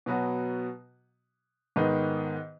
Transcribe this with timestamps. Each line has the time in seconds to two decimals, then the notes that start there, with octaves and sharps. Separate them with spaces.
0.06 B2 F#3 B3 F#4
1.76 G#2 D#3 B3 D#4